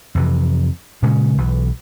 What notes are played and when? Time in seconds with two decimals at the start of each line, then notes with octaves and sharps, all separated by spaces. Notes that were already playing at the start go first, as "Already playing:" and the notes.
0.15 F2 C3 E3
1.02 A#2 C#3 G#3 C#4
1.38 B1 E3